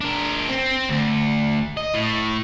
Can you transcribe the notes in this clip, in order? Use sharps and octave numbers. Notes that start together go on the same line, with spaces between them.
D4 A#4
C4
D2
D#5
A2